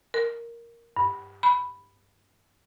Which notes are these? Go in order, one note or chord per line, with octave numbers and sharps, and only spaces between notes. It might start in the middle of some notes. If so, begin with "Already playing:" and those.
A#4
G2
B5